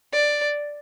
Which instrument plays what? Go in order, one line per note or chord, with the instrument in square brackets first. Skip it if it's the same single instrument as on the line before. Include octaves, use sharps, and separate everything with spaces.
[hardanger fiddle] D5